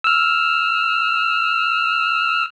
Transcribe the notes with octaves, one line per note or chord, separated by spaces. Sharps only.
E6 F6